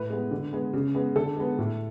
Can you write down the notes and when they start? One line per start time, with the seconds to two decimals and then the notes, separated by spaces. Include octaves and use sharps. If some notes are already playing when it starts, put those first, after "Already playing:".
Already playing: A2 B4
0.10 G#3 B3
0.31 D3
0.53 G#3 B3
0.73 C#3
0.95 G#3 B3
1.16 D3 A4
1.36 G#3 B3
1.58 A2